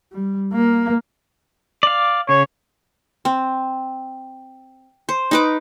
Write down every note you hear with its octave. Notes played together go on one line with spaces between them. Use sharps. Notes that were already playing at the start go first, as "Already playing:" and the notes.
G3
A#3
D5 F5
C#3 C#5
C4
C5
D#4 B4 D6